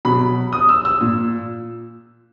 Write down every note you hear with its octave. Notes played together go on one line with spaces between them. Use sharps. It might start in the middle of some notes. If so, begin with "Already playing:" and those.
B2 F#3 B5
D#6
E6
E6
A#2